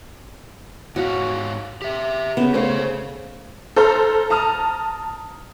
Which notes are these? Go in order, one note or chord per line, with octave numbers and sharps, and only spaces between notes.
G#2 F#4 C#5 F5
G4 E5
C#3 B3
A3 C#4 C5 F5
A4 C5 A#5 F6
A5 A#5 D#6 F6